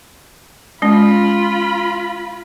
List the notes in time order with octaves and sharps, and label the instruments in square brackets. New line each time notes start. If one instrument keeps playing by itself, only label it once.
[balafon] G#3 C#4 [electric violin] F4 B5